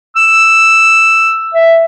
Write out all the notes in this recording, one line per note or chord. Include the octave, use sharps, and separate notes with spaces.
E6
E5